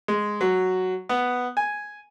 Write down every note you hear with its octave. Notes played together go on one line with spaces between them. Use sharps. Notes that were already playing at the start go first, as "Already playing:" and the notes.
G#3
F#3
B3
G#5